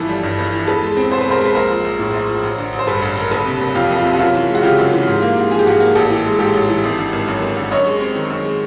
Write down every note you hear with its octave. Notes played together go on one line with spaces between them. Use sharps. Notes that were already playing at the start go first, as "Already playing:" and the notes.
Already playing: G1 E3 F3 A4 B4
G3
G2
G1
E3
E2 A4 B4
G#3
C4
B2 C5
B4
E2 A#4 C5
G#3 B4
A#1 A#4 C5
F3
A#1
A2
A#1
F3
A1
D3
A1
C5
G2 A4 B4
A1
D3 A#4
F#1 A4 B4
C3
F#1
F2 F4 G4
F#1
F4
C3
F#4
F#2 F4
E3
G#3
F#4
C#3 F4 G4
F#2
E3
G#2
A#3
G#2
F3 G#4
G4
G#2 F#4 G#4
A#3
A1 G4 A4
E3
G#3
G#2 G4 A4
A1
E3
G#1
D3
G#1
F#2
G#1
D3
F#2 C#5 D#5
G#3
C4
D#3
F#2
G#3